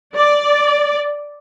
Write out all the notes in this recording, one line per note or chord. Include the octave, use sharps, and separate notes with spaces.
D5